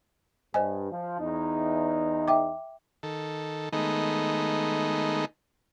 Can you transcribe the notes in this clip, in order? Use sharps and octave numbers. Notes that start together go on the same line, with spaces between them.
G2 C5 D#5 G#5
F3
E2 D#4
E5 G5 D6
D#3 A4
D#3 G#3 A3 B3 D#4